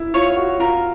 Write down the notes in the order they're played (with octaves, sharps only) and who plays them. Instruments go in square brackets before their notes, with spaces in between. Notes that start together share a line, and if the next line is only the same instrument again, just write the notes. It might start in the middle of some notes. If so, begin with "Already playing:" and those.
Already playing: [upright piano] E4
[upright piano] F4 [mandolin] C#5
[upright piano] F#4
[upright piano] F4 [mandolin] A#4